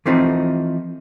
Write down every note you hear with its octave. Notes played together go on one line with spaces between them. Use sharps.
E3 F3 A3 C4 D#4